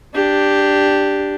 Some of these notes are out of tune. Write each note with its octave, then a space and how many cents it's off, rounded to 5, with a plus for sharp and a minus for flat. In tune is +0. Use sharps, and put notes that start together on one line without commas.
D4 +0 G4 +0